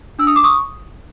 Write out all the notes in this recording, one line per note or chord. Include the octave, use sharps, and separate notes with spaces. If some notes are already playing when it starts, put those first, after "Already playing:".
D4 E6
D#6
D6
C#6 D#6